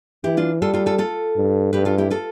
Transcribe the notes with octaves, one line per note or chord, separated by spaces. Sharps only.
E3 E4 G4
D4 F4
G3 F4 A4
F4 A4
F4 A4
F4 A4
G2
G2 G4 B4
F4 A4
E4 G4
F4 A4